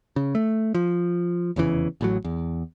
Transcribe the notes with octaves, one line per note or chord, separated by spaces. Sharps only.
C#3
A3
F3
F1 E2 C#3 E3
A1 A2 F#3
E2